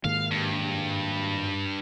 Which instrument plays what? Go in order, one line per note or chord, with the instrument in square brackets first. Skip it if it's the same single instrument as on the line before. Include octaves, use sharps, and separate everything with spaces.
[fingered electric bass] G#2 D#3 A#3 [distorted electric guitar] F5
[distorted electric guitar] G2